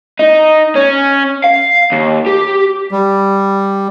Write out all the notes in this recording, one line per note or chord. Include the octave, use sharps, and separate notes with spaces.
D#4
C#4
F5
D#2
G4
G3